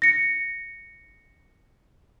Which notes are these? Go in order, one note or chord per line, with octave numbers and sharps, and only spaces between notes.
A#6 C#7